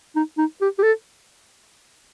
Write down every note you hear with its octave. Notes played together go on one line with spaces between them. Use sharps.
D#4
D#4
G4
G4
A4